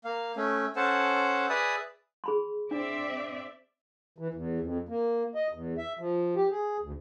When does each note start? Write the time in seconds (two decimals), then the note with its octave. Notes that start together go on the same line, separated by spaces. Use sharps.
0.05 A#3 F5
0.36 A3 C#4
0.76 C#4 A4 C5 F#5 A5
1.49 G#4 B4 D5 E5 D#6
2.24 G#4 B5 C6
2.71 C4 D4 D5 E5
4.18 E3
4.34 E2
4.60 F2
4.89 A#3
5.35 D#5
5.53 E2
5.78 E5
5.99 F3
6.36 G4
6.50 G#4
6.82 D2